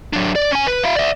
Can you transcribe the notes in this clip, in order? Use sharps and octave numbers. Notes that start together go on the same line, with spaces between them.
F#3 D4
D5
C#4 G#5
B4
E4 F5
D5 E5